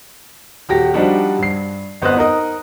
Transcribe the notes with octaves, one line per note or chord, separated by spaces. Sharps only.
D#1 F#4 G4 A#6
F3 G3 D4 D#4 F#4 G4
G2 C7
G1 B3 C4 C5 D#5 F#6
D#4 A#4 D#5